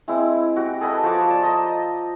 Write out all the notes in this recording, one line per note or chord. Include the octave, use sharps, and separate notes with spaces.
G#3 C4 E4
F#4 G4
G#4 A4 B4 D#5
F3 C5 C#5 D6
D5 A5
D#5 A#5